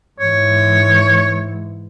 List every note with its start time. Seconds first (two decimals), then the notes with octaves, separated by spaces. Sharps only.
0.20 G#2 E3 C#5